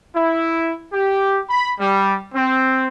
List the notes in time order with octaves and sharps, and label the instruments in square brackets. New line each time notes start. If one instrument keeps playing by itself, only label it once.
[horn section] E4
G4
B5
G3
C4